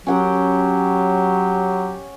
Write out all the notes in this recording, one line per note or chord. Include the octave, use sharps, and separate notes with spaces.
F#3 C#4 G4 F#5 G5